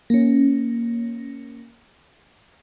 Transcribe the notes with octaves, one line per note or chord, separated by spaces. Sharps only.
A#3 C#4